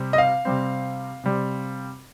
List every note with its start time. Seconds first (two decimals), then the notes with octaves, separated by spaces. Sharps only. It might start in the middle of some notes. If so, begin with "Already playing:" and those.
Already playing: C3 G3 C4
0.13 D#5
0.18 F5
0.45 C3 G3 C4
1.24 C3 G3 C4